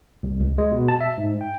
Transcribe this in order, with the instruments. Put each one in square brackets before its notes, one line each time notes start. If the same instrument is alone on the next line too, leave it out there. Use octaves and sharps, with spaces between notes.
[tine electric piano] C2
C#2
G#3
B2
A5
E5
G#2
G5